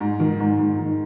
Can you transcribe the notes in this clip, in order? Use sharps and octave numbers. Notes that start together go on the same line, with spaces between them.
G#2
D#3
G#2
G#2
D#3